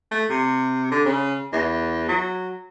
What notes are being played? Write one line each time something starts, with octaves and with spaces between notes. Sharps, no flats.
A3
C3
D3
C#3
E2
F#3